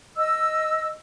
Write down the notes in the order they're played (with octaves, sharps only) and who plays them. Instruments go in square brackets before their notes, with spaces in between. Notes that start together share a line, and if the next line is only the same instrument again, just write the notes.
[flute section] D#5 E6